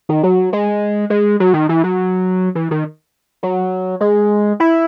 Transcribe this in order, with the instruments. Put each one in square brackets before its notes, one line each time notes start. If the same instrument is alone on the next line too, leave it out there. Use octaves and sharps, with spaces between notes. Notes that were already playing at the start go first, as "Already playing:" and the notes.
[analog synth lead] D#3
F#3
G#3
G#3
F#3
D#3
E3
F#3
E3
D#3
F#3
G#3
E4